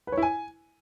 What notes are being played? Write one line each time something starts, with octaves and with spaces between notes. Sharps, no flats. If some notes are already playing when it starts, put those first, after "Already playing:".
B4
C#5
E4
G#5